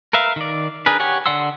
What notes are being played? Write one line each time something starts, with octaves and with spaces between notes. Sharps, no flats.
A#4 B4 E5 F5
D#3 D5
D4 G#4 A#4 B4
G4 C#5 F#5 G#5
D3 D5 F#5 C6 E6